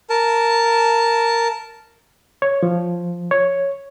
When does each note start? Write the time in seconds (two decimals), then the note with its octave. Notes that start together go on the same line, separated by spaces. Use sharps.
0.10 A#4 A5
2.42 C#5
2.63 F3
3.31 C#5